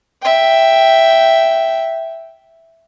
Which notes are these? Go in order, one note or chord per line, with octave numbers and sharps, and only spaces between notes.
E5 G5